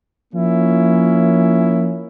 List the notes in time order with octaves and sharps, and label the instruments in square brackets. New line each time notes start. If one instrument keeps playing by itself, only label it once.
[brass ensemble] F3 A#3 C#4 E4